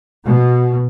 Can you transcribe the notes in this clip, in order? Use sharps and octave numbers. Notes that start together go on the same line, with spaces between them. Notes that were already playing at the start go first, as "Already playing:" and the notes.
B2